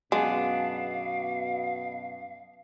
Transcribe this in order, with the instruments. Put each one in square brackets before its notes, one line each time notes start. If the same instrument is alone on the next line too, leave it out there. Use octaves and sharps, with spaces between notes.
[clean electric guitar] F#2 B3 D4 [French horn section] B2 [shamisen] G#3 [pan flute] F5